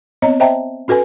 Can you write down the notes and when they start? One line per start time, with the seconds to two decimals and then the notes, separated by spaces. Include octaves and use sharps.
0.22 B3 C4 C#5 D#5 A#5
0.40 C5 D#5 E5 G5 A5 A#5
0.88 C#4 F#4 A4 B4 G#5